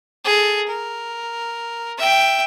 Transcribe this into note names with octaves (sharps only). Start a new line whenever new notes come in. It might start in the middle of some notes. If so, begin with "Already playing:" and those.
G#4 A4
A#4
E5 G5